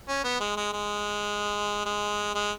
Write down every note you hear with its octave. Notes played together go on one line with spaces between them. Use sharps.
C#4
B3
G#3
G#3
G#3
G#3
G#3